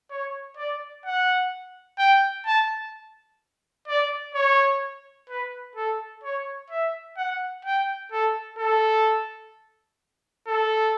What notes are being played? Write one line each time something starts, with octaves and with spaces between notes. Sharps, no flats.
C#5
D5
F#5
G5
A5
D5
C#5
B4
A4
C#5
E5
F#5
G5
A4
A4
A4